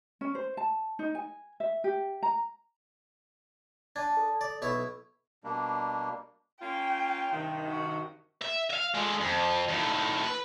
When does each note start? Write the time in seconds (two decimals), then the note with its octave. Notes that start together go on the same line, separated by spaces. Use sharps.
0.21 C#4
0.35 C5
0.57 A5
0.99 D#4
1.15 G#5
1.60 E5
1.84 G4
2.23 A#5
3.96 D4 A5 G#6
4.17 A4
4.41 D5
4.62 B1 E4 C#5
5.44 B2 G3 A#3 D4
6.62 A#3 C#4 F4 G5
7.33 G2 C3 D#3
7.68 F#4
8.42 E5
8.71 E5 F5
8.95 D3 G#3
9.21 F2
9.68 D#2 A2
10.24 B4